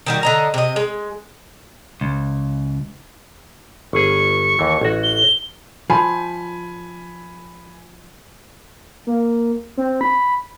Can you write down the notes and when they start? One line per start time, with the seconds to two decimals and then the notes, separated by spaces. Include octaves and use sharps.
0.06 D#3 G3 F#4
0.23 D3 D#5 A#5
0.54 C3 D#5
0.76 G#3
2.01 C#2
3.93 G1 G#4 C#6
4.59 D#2 E3
4.81 A1 F#4
5.03 G7
5.90 F3 G#5 B5
9.07 A#3
9.77 C4
10.01 B5